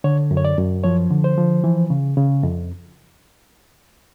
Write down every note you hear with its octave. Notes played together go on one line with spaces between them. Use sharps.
D3 C#5
F#2
C#5
D5
F#2
F3 C#5
D3
C5
F3
E3
C#3
C#3
F2